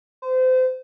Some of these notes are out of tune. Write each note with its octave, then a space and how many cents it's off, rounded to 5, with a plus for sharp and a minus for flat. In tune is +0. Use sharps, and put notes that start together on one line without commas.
C5 -30